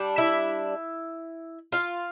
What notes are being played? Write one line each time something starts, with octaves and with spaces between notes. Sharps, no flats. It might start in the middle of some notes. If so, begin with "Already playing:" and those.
Already playing: G3 D4
E4 E5
F4 F5